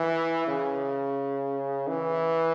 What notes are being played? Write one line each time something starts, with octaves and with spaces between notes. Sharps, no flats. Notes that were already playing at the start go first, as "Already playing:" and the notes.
Already playing: E3
C#3
E3